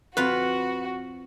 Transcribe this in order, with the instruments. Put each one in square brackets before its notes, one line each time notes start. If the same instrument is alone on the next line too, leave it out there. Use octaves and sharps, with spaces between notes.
[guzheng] F2 F4 F5 [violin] F#4 [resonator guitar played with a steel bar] B4